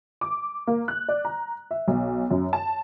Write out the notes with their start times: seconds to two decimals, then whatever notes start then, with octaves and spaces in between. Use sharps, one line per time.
0.21 D6
0.67 A#3
0.88 F#6
1.08 D5
1.25 A#5
1.71 E5
1.88 B1
2.31 F#2
2.53 A5